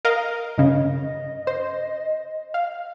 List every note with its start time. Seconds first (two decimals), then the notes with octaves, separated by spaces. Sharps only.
0.05 A#4 D#5 F5
0.58 G2 C#3 D#5
1.47 C5
2.54 F5